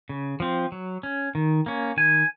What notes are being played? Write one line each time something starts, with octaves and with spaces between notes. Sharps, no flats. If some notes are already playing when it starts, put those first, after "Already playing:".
C#3
F3 C4
F#3
C#4
D#3
A#3 C#4
D#3 G#5